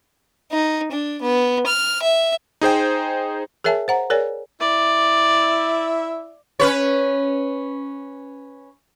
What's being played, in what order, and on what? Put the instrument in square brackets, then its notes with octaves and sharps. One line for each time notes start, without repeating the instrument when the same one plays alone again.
[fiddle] D#4
D4
B3
F6
E5
[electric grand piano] D#4 G#4 C5 G5
[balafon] G#4 A#4 C#5 E5 G#5 A5
C5 F#5 A#5
G#4 A#4 C#5 D5 G#5
[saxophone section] E4 E5 [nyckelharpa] D5
[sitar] C#4 B4 C#5